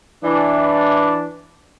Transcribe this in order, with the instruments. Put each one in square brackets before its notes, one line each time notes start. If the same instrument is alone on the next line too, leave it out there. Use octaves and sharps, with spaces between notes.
[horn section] E3 D4